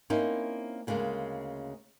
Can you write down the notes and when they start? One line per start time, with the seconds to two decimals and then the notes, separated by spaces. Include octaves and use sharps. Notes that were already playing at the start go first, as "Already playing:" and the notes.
0.10 A#3 C4 C#4 D#4 E4
0.87 D2 C#3 G3 G#3 A#3